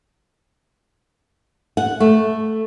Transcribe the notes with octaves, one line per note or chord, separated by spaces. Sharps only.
F#5
A3